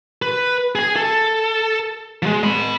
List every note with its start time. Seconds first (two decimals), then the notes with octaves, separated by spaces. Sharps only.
0.22 B4
0.75 G#4 G#5
0.96 A4
2.22 F3 G#3
2.43 D#5 B5